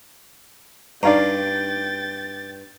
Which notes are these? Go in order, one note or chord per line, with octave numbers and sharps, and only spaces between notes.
G2 D#4 G4 D5 F5 G5 A#5 A6